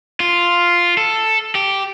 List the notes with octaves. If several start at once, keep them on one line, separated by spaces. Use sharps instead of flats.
F4
A4
G4